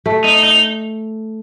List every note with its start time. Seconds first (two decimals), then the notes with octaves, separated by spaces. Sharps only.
0.06 A3
0.24 D#4
0.43 D#4